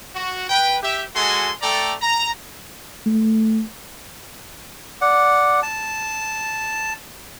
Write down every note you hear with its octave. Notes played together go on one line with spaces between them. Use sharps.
F#4
B4 G5
G4 E5
G#3 F#4 A4 G#5 C6
A3 A4 D5 G5 A#5
A#5
A3
D5 F#5
A5